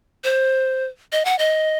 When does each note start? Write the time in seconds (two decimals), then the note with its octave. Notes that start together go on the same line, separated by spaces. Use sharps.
0.24 C5
1.12 D#5
1.25 F#5
1.39 D#5